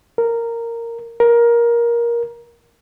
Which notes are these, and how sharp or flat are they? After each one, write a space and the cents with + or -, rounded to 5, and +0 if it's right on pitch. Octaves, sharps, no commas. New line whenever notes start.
A#4 -10
A#4 +15